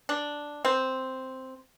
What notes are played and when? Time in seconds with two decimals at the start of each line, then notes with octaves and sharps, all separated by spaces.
0.09 D4
0.65 C4